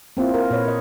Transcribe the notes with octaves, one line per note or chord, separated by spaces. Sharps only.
A#3 C4 E4 F4
A#4
A#2 B4 C#5
A#4 D#5